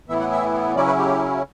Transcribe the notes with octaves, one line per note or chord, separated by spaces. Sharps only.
A2 E3 B3 E4 E5
F#5
E5
C#3 F#3 C#4 E4 D5
B4
G4